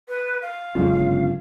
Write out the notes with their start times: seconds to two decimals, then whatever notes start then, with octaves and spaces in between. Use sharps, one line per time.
0.09 B4
0.42 F5
0.75 F2 C#3 F#3 G#3 C#4 F4
0.93 G1 F#2